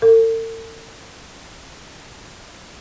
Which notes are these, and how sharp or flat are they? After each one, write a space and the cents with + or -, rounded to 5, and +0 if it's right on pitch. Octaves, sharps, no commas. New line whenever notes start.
A4 +45